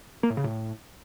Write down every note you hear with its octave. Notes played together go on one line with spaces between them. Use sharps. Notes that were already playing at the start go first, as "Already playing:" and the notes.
A#3
A2
C#3
A2